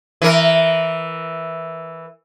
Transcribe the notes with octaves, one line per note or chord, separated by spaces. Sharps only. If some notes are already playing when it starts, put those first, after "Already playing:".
E3 A#4